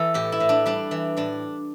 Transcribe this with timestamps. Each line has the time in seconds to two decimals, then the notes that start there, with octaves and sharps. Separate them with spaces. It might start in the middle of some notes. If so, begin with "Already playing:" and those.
Already playing: E3 A4 B4
0.14 A2 G4
0.32 E4
0.40 A2
0.49 D4
0.66 G3 D4
0.91 E3
1.17 A2 D4